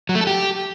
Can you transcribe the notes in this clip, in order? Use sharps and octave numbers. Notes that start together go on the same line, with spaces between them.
F#3
A3
A4
G4